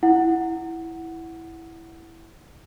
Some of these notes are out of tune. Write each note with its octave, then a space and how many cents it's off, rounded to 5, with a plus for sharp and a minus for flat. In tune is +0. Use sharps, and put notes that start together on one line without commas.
E4 +0 F#5 +0